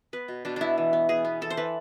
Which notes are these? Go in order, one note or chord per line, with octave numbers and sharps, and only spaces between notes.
B3 B4
B2
B2 D4
B3 D4 E4
E3
B3
B3 G#4
B3
E3 A4
C5
E3 B4